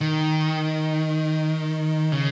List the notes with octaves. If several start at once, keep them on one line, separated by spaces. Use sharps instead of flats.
D#3
C#3